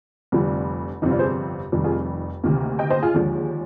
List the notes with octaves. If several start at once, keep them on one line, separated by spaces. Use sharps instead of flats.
F1 F2 D3 G3
G1 F2 C3 G3 C4 D#4
D4 F4
G#4 C5
F1 F2 D#3 G3
F4 G#4
D2 C3 D#3 A#3
D#5 G5
C5 D#5
F4 G#4
D#2 D3 F3 G#3